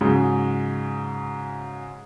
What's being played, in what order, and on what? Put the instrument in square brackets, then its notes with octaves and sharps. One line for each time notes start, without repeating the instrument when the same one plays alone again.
[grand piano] G#2 C#3 F#3 G#3